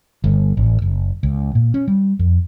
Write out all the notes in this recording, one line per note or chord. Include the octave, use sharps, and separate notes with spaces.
G1
A1
F#1
C#2
A#2
C#4
G3
F2